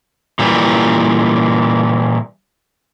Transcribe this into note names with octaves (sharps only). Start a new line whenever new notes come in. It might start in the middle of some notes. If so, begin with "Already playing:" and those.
A#2 E3 G3